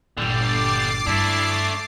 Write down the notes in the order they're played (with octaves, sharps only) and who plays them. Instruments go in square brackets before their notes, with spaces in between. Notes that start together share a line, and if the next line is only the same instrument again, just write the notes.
[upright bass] G1 A#2 [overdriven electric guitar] D3 G3 [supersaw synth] D6 A6 C7
[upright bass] G2 [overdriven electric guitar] A3 D4 [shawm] E4